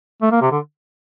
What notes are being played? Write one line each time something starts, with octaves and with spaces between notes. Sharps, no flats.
A3
A#3
C3
D3